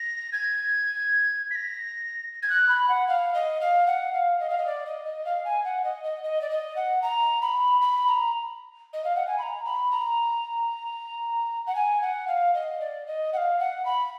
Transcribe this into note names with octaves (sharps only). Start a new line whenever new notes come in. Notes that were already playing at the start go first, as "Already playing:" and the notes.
Already playing: A#6
G#6
B6
A#6
G#6
F#6
B5
F#5
F5
D#5
F5
F#5
F5
D#5
F5
D#5
D5
D#5
D#5
F5
G#5
F#5
D#5
D#5
D#5
D5
D#5
F#5
A#5
B5
B5
A#5
D#5
F5
F#5
G#5
B5
A#5
B5
A#5
F#5
G#5
F#5
F5
D#5
D5
D#5
F#5
F5
F#5
B5